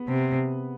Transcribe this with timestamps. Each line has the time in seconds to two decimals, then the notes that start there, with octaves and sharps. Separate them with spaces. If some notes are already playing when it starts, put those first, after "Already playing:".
Already playing: B3
0.08 C3